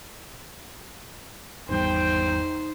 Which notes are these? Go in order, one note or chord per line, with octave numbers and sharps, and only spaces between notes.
G#1 E2 G3 D#4 C5 G5